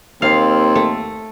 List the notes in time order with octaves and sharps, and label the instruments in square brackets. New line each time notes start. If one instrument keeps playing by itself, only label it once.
[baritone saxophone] D#2 [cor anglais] C4 [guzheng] F5
[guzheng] A3